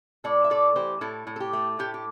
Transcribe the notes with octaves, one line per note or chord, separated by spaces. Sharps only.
A2 A4 D5
E5
A3 A4 D5
E3 G4 C5
A2 E4 A4
A2
A4
G4
A3
A2 G4
G4